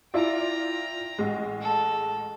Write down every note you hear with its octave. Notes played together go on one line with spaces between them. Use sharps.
E4 F4 D5 G5 A#5
A1 G#3
A4